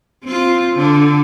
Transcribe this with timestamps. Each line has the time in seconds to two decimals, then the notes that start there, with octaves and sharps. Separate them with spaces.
0.24 C4 F4
0.75 D3